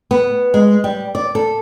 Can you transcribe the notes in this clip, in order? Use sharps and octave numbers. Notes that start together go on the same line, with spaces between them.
B3
G#3
G3
D5
A4